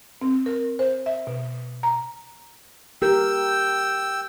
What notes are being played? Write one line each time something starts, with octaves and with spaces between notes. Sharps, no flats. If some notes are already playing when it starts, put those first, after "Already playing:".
C4
A#4
C5
E5
B2
A#5
G4 A#4 G5 E6